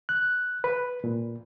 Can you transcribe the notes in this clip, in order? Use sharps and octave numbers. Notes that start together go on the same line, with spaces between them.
F#6
B4
A#2